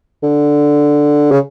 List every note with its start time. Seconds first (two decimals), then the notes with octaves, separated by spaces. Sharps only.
0.23 D3
1.31 C#3